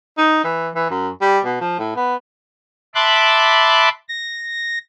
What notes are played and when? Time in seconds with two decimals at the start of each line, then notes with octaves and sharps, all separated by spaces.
0.18 D#4
0.44 E3
0.75 E3
0.90 F#2
1.21 G3
1.45 B2
1.61 F3
1.79 A2
1.96 B3
2.95 E5 A5 B5 C6 D6 F#6
4.09 A#6